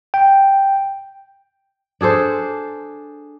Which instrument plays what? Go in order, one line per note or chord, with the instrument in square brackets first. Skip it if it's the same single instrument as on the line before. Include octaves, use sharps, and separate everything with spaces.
[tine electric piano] G5
[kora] D4 G#4 A4 C5